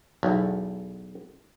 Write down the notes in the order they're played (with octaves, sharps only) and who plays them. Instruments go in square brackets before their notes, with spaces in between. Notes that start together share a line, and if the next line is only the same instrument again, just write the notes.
[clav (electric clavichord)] B1 E2